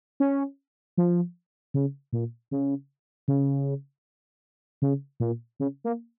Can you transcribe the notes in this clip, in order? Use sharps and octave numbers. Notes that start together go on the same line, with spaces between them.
C#4
F3
C#3
A#2
C#3
C#3
C#3
A#2
C#3
A#3